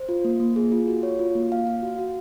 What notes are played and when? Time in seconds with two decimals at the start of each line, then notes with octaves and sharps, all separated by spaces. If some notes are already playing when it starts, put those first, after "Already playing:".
Already playing: C5
0.09 F4
0.25 A#3
0.40 A#3
0.56 G#4
0.72 F4
0.88 F#4
1.03 C#5
1.19 F4
1.35 A#3
1.52 F5
1.67 F5
1.83 F#4
1.98 F#4